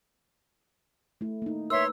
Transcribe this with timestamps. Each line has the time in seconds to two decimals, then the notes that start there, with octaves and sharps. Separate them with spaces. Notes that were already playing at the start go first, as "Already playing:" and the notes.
1.21 A3 E4
1.42 A#3 D#4
1.70 A#4 B4 C#5 E5 C6 E6